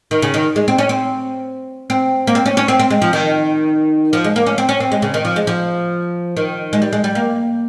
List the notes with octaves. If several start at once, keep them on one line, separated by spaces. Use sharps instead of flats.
D#3
C#3
D#3
G#3
C4
C#4
C4
C4
A#3
C4
C#4
C#4
C4
C4
G#3
F3
D#3
F3
G#3
A#3
C#4
C4
C#4
C4
G#3
C#3
D#3
F3
G#3
F3
D#3
G#3
G3
G#3
G3
A#3